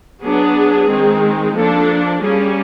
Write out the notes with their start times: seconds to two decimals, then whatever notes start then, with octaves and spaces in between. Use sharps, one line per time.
0.21 F#3 B3 D4 G#4
0.88 D#3 G#3 C4
1.54 F3 A#3 D4 A4
2.21 G3 A#3 C#4 G#4